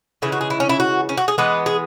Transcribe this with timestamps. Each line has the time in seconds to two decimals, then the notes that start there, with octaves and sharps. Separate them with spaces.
0.22 C#3 E3 G#3 E4
0.32 F#4
0.41 G#4
0.50 E4
0.60 C#4
0.69 E4
0.80 F#4
1.09 C#4
1.17 F#4
1.28 G#4
1.38 E3 G#3 B3 B4
1.66 G#4